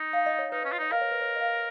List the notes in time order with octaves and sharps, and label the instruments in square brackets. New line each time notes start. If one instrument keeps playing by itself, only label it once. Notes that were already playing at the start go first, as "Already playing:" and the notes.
Already playing: [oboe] D#4
[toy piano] F5
D#5
C#5
[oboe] D#4 [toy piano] B4
[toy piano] B4
[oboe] C#4
F4
[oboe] D#4 [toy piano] D#5
[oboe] A#4 [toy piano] F5
[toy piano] C#5
B4
C#5
D#5
F5